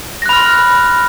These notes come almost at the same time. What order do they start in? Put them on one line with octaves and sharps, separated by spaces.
A#6 F#6 B5 F6 C6